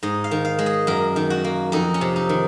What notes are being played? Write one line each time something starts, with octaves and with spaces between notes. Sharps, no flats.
G#2 D#5
F5
D#3
F5
G#3
D#5
F#2 A#4
D#3
F#4
A#3
F2 D#4
C#4
C3
D#4
D#3